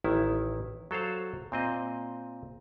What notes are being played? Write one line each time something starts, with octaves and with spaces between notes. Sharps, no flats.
A1 D#3 E4
F#3 A4 C5 F5
A#2 C4 D#5